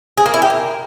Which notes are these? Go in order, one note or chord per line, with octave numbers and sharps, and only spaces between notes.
G#4
A#3
E4
G4
A#3